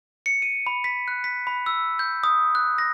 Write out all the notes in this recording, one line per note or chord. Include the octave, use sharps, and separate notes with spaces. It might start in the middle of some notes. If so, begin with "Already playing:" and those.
C#7
D#7
B5
B6
F#6
B6
B5
E6
G6
D#6
F#6
A#6